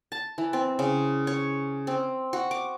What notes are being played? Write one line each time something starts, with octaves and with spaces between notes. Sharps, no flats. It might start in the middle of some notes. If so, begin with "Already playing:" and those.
A5
E3
C4
C#3
C#5
C4
F#4
D6